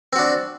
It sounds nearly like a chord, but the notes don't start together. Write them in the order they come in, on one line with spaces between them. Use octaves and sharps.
C4 F#4 D4